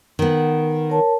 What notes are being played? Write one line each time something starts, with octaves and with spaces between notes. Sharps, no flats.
D#3 B3
A#4 C#5 A5